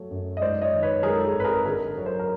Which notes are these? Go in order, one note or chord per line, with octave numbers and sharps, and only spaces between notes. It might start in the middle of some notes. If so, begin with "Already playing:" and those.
Already playing: F#3 A3
F#2
D#5
G#2 C5 D5
C#5 D#5
D#3
B4 C#5
G#3 G#4 A#4
A4
G#4
G#1
B4
G#4 A#4
D3 G#4 A#4
F#3 C#5
A#4 C5
A#4